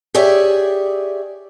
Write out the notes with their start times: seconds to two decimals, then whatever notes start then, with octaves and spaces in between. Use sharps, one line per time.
0.15 G4 G#4 C#5 D5 E5